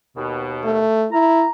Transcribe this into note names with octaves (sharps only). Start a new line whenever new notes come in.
D#2 B2
A3
E4 A#5